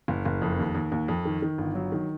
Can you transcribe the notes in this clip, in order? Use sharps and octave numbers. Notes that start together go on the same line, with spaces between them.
F#1
F#1
F2
D#2
D#2
D#2
F2
D#3
D#3
G1
F#3
D#3